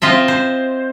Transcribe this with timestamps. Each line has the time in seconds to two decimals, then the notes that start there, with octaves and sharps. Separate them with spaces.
0.02 C4 F4 D#5 E5
0.28 C5